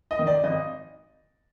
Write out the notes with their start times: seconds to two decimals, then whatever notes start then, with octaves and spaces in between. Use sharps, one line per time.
0.11 D#5
0.19 D#3
0.27 D5
0.44 G#1 D#5